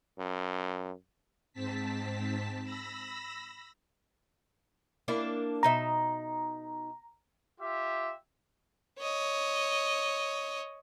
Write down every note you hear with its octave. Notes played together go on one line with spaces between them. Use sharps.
F#2
G#2 C4 A5 B6
B5 E6 A#6
A#3 D4 E4
B2 D#4 E5 A#5
F4 G4 E5
C#5 D#5